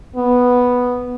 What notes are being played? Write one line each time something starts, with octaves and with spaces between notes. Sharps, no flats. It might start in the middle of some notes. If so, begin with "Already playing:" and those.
B3